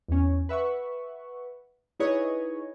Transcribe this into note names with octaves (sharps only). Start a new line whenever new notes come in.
E2 C#4
B4 E5 F#5 C#6
D#4 E4 G#4 B4 C#5 D#5